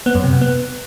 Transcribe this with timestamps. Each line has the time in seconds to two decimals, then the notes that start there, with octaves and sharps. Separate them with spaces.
0.06 B3
0.15 F#2
0.24 C3
0.33 B2
0.41 B3